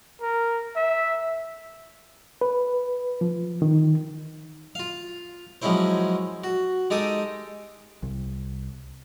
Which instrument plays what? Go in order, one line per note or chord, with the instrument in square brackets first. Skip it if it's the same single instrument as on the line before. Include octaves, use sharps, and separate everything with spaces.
[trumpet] A#4
E5
[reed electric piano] B4
F3
D#3
[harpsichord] F4 F5
F3 F#3 G#3 C#4 E4 C5
F#4
G#3 D#4 G4 A4 D6 D#6
[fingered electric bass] C2